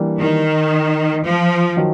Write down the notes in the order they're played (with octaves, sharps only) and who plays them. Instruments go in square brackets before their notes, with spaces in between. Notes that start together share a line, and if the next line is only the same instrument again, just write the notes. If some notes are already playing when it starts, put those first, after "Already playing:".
Already playing: [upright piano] E3 G3 A#3 D4
[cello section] D#3
F3
[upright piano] D#3 F#3